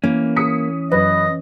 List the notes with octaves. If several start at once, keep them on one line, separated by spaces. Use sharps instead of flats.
E3 A#3 C#4
D#6 B6 C#7
F#2 B4 D#5